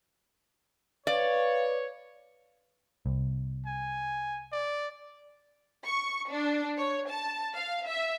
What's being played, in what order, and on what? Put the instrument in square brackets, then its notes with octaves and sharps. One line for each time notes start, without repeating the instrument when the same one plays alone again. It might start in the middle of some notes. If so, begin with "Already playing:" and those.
[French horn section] B4 [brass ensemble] C#5 [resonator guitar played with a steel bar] D5 [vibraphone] F5
[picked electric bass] C2
[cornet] G#5
D5
[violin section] C#6
D4
C#5
A5
F5
E5